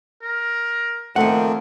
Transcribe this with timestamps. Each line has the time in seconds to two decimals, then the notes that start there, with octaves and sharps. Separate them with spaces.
0.23 A#4
1.16 D#3 F3 A3 A#3 C4 F#5